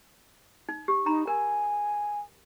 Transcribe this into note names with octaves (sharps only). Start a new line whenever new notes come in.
D#4
G4
D#4 A#5 B5
A#4 G#5